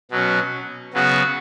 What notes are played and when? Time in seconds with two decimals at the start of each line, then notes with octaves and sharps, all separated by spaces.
0.11 B2 F#3 C#4
0.93 C#3 F#3 B3 F#4